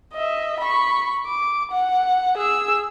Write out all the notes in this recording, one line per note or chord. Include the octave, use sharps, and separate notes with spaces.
D#5 E5
B5 C#6
D6
F#5
G#4 E6